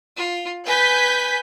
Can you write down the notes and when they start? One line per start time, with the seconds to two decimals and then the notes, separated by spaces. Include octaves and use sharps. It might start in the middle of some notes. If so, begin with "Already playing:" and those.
0.17 F4
0.66 B4 G#5 G6 B6